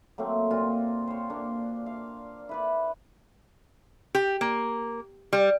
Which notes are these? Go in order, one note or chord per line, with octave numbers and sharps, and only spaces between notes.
F#3 A3 A#3 C4
A#2 F4 F#4
C5 C#5
A#3 D4
F5
E4 B4 D5
G4
A#3
G3